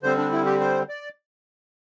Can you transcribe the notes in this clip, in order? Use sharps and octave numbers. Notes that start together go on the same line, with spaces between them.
D3 G3 C4 C5
D4
E4
G4
C5
D5